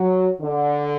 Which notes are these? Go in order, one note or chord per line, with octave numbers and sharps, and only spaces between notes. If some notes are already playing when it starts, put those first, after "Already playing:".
Already playing: F#3
D3